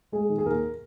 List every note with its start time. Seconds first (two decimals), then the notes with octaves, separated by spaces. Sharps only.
0.12 G#3 G#4
0.29 D#3
0.38 G#4
0.46 D#2 A#4